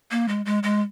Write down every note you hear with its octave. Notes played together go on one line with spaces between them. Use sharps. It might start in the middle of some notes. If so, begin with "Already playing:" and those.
A#3
G#3
G#3
G#3